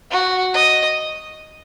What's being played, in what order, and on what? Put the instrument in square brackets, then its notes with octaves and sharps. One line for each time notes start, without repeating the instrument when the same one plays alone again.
[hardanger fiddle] F#4
D#5